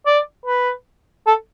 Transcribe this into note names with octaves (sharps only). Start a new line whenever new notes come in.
D5
B4
A4